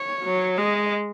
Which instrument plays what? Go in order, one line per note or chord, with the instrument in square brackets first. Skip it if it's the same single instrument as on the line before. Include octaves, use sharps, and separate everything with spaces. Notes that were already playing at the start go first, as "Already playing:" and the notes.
Already playing: [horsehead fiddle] C#5
[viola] F#3
[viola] G#3 [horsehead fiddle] D#5